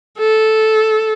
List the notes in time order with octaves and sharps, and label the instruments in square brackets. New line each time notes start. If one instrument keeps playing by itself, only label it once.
[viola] A4